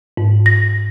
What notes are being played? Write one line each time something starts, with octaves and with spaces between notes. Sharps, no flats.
G#2
A#6